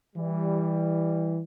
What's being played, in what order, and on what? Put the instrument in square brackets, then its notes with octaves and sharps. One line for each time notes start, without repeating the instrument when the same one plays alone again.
[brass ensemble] E3 G3